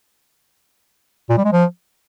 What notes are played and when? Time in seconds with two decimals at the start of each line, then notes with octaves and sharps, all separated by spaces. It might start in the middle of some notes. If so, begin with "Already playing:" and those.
1.30 A#2
1.37 G3
1.45 G#3
1.53 F3